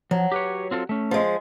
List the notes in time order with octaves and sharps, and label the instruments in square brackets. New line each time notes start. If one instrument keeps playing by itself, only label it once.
[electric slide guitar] F3 [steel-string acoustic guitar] F#3
[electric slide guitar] G4 B4 C#5
C4 F4 A4
A3 C#4
[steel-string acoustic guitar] F3 G#3